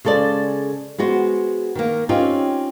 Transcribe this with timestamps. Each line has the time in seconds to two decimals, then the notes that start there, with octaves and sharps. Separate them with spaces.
0.05 C#3 G#3 A4 C5 D5
0.98 G#3 B3 F#4 C5
1.75 D#3 A#3
2.09 C4 C#4 D#4 F4 G4 C#5